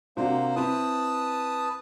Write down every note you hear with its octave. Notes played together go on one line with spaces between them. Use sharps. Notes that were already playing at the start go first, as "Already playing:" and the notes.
C3 A#3 D4 F#4 C5
C4 E4 B4 A5 D#6